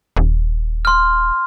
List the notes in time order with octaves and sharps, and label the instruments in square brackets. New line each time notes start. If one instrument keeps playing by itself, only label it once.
[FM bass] D#1
[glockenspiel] C6 F6